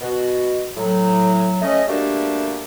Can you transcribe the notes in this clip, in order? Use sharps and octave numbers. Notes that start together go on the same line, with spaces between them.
B2 F#4
A2 F#3
A3 C#4 D#5
G3 A3 A#3 D4 F#4 G4